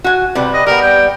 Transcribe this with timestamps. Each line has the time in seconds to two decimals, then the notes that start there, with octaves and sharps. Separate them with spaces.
0.04 F#4 G#5
0.35 C3 G3 B4
0.54 D#5
0.67 G3 B3 A#4
0.82 G5